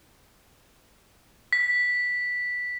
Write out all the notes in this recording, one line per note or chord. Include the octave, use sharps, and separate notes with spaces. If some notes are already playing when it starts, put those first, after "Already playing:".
B6